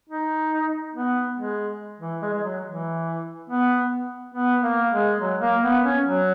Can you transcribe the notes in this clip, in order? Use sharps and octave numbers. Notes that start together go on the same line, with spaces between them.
D#4
B3
G#3
E3
G#3
G#3
F#3
E3
B3
B3
A#3
G#3
F#3
A#3
B3
C#4
F#3